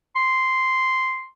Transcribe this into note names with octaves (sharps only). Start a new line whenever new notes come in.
C6